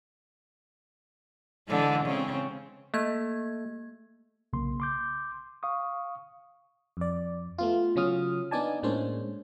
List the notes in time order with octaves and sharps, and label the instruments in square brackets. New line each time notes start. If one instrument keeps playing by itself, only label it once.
[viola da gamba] D3 E3 G#3
C#3 C4
[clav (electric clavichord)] A3 [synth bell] A#3 G#6
[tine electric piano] B1 C#3 A#3 C6
C6 D6 G6
F5 C#6 D#6
[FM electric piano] F2 D5
A3 B3 F4
C#3 F#3 C#4 F4 D#6 F6
B3 D4 D#4 D5 G#5 A5
A2 G#3 A#3 C#4 D4 C5